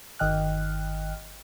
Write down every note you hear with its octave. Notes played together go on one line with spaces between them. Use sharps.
G1 D#3 D#5 G5 F6 F#6